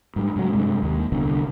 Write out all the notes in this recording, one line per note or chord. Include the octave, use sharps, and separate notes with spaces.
G#2 G3
G#2 C#3 F3 F#3
G2 C3 G#3
D#2
D1 C2 D3 B3